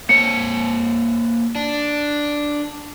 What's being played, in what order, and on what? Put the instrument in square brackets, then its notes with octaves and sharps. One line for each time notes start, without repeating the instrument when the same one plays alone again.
[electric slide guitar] A#3 C5 C#5 [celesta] C#7
[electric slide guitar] D4